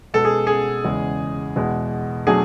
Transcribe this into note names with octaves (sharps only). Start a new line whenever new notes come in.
B2 G#3 B3 A4
G#4
G#4
E2 C#3 G#3
E2 B2 G#3
B2 F#3 A3 D4 G#4